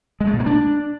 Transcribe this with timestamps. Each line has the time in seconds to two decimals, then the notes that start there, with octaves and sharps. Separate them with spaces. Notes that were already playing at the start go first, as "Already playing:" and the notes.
0.21 G#3
0.27 A3
0.33 B2
0.40 A#3
0.46 D4